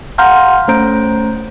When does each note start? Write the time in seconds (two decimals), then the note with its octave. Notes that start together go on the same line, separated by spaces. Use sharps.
0.18 F5 F#5 A#5 C6 F6 G6
0.68 A3 C#4 C5 A#5 G6 D7